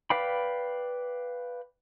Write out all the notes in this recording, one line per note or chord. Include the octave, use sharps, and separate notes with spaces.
B4 D5 F5 G5 B5